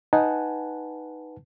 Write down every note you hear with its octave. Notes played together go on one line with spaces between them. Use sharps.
D#4 B4 F#5 G#5 A5